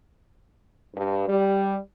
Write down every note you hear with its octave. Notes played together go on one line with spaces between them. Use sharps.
G2
G3